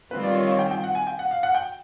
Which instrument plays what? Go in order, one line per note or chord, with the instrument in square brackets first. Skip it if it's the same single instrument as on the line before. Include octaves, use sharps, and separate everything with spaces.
[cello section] D#3 G3 C4 F4 [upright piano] B4
[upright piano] D5
C#5
C#5
G5
G5
F#5
G#5
G5
F#5
F5
F#5
G5